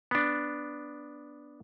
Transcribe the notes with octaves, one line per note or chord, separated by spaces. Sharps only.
B3 D4